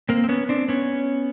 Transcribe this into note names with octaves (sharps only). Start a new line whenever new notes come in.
A#3 C4
C4
B3 C#4
C4 D4
B3 C#4